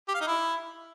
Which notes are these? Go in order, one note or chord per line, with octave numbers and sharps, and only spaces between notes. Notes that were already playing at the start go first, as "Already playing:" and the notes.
G4
F5
D#4
E4